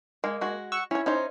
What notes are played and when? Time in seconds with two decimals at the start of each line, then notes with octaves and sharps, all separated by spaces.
0.24 G#3 A#3
0.41 G#3 F#4
0.72 F#5 C#6 E6
0.91 C#4 E4 C#5
1.06 C#4 D#4 C5